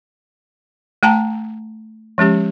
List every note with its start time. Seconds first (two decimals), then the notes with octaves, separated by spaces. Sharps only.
1.03 A3 G5 A5 A#5
2.18 F3 G#3 C#4 G4